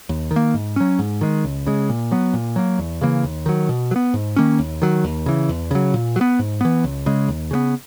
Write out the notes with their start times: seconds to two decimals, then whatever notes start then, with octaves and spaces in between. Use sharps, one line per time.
0.09 D#2
0.31 D#3
0.36 A#3
0.54 G#2
0.76 F#3 C#4
0.99 G#2
1.21 D#3 G#3
1.44 C#2
1.67 C#3 G#3
1.89 A#2
2.11 F#3 B3
2.34 A#2
2.56 F#3 A#3
2.79 E2
3.01 C#3 E3 A#3
3.24 D#2
3.46 D#3 F#3
3.69 B2
3.91 F#3
3.96 B3
4.14 G#2
4.36 D#3 A#3 C#4
4.59 D#2
4.82 D#3 F#3
5.04 D#2
5.26 C#3 E3
5.49 E2
5.71 C#3 F#3
5.94 A#2
6.16 F#3
6.21 B3
6.39 G#2
6.61 E3 B3
6.84 C#2
7.06 C#3 G#3
7.28 D#2
7.51 C#3 G#3 B3